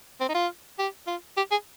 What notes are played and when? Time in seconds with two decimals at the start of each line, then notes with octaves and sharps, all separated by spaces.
0.20 C4
0.28 D#4
0.34 F4
0.79 G4
1.07 F4
1.37 G4
1.51 G#4